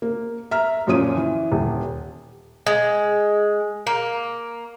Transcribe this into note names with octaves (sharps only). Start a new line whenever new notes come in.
A#3
E5 A#5 F6
F#2 A#2 F3 C#4 D#6 D#7
E3
D#1
G#3
A#3